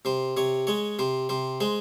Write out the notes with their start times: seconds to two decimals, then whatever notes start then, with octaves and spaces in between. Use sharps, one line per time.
0.05 C3 C5
0.37 C3 C#5
0.67 G#3 C#5
0.99 C3 C5
1.29 C3 C5
1.61 G#3 C5